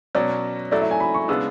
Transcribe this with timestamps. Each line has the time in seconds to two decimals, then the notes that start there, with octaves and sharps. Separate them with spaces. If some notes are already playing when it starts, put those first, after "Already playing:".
0.15 B2 F#3 C#4 D5
0.71 F#3 A3 E4 D5
0.82 E5
0.91 G#5
1.00 B5
1.14 C#6
1.28 C#3 G#3 B3 D4 E6